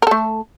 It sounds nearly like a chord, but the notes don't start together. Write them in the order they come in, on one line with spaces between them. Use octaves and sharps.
A#4 A4 A3